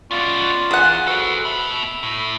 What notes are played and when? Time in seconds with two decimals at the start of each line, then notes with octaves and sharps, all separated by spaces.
0.11 B3 C#4 F4 D5
0.71 E2 G#4 F#5
1.07 F#4 A4 B4 C5
1.45 B2 E5 B5
2.03 A2